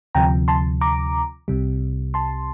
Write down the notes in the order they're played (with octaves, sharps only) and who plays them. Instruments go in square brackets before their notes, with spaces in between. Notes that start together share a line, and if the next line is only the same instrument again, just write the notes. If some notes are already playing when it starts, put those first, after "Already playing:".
[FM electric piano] D2 C3 F3 G5 A#5
A5 C6
A#5 D6
C2 C3 G3
A5 C6